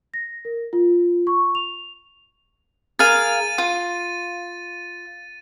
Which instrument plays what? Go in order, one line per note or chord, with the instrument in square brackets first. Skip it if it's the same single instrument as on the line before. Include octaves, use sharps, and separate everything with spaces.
[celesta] A#6
A#4
F4
C#6
F7
[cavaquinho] G#4 A#4 F5 [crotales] A6 D#7
[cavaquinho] F4